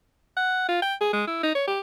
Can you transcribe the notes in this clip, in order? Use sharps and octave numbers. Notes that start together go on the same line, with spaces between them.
F#5
F4
G5
G#4
G#3
E4
D#4
C#5
G4